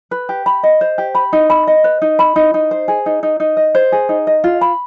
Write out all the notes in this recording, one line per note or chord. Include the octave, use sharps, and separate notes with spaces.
B4
G4
B5
D#5
C5
G4
B5
D#4
B5
D#5
B4
D#4
B5
D#4
D#4
C5
G#4
D#4
D#4
D#4
D#5
C5
G#4
D#4
D#5
F4
B5